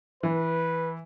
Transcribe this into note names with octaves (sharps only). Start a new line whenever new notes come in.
E3 B4